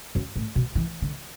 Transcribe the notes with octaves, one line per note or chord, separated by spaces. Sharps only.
F#2
A2
B2
E3
D3